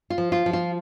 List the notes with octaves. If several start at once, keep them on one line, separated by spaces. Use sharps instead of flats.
F4
F3
F4
F3
F4